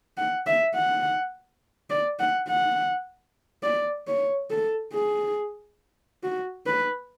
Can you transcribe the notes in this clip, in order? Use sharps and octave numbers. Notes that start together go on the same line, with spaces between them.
F#5
E5
F#5
D5
F#5
F#5
D5
C#5
A4
G#4
F#4
B4